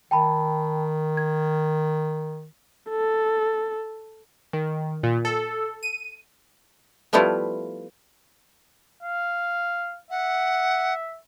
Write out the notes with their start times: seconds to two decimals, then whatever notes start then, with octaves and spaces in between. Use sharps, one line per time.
0.11 D#3 G5 A5 B5
1.17 G#6
2.90 A4
4.53 D#3
5.03 A#2
5.25 A4
5.83 D#7
7.13 F3 G3 A3 B3 E4 F4
9.03 F5
10.11 E5 F#5